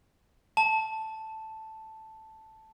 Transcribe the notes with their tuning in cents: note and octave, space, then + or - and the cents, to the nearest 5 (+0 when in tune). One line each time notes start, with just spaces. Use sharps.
A5 +0